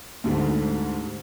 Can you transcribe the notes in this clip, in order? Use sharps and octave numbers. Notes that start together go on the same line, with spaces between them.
D2 G#2 D3 G3